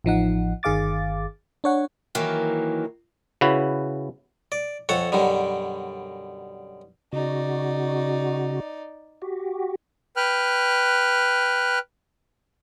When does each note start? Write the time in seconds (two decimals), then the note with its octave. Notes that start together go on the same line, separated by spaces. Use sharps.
0.04 A1 F3 D#4 F#5
0.63 G1 D#3 G#4 F5 D6 A6
1.64 D4 C#5 F#5
2.15 D#3 E3 F#3 A#3
3.41 C#3 E4 F#4 B4
4.52 D5
4.89 F2 A4 C#5 F#5
5.12 F#2 B2 D3 G3
7.13 C#3 D#4 F#4 D5
9.22 F#4 G4
10.16 B4 G5 F6 F#6